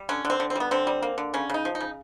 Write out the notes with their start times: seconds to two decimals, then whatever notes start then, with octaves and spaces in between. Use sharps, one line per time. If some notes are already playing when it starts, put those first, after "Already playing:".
Already playing: G3
0.09 D3 C#4
0.25 D3
0.30 C4
0.40 D3
0.50 C4
0.55 G3 B3
0.71 D3 C4
0.87 G3
1.02 A#3
1.18 D3
1.34 C#3 C#4
1.50 C#3 D#4
1.65 F3
1.75 D#4
1.80 C#3